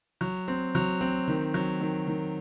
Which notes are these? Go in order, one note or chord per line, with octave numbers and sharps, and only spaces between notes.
F#3
C4
F#3
C4
D#3
F#3
D#3
D#3